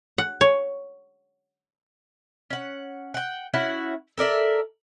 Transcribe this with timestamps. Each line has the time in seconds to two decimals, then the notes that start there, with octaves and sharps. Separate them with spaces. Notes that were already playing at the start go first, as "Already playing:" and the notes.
0.18 F#5
0.41 C#5
2.50 C#4 F#5
3.14 F#5 G5
3.54 C#4 E4 F#4 F#5
4.18 A4 A#4 D5 E5